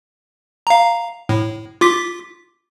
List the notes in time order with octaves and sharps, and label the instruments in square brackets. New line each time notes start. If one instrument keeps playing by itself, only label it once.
[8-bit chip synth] F5 A#5
A2
F4 D6 B6